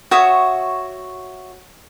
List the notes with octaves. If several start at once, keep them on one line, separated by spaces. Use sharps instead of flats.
F#4 C#5 E5 D#6